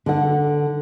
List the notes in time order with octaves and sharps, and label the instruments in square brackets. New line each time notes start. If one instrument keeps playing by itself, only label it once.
[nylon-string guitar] D3 F#5